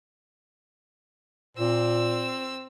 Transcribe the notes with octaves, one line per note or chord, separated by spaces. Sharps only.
A#2 C4 E6